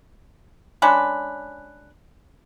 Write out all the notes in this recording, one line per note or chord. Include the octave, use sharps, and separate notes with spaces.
G#3 C#4 D4 B4